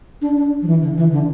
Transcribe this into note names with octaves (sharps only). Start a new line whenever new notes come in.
D4
D4
F3
E3
D3
E3
D3